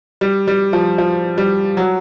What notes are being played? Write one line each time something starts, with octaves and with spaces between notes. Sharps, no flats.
G3
G3
F3
F3
G3
F#3